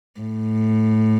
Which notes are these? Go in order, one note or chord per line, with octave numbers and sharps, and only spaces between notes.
A2